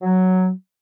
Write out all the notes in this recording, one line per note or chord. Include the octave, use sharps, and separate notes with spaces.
F#3